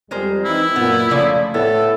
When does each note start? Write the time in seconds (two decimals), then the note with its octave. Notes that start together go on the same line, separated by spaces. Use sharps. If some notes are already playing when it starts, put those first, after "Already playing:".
0.11 F2 G3 G#3 A#4 C5
0.45 E3 C4 D#4 E4
0.76 F#2 A#2 B3
1.11 C#3 F3 A3 D5
1.54 A2 B3 A4